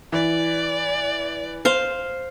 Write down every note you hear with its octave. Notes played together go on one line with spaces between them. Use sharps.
E3 D5
C5 F5